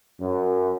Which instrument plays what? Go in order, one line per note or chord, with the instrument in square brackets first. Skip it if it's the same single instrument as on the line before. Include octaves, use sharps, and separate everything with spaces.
[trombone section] F#2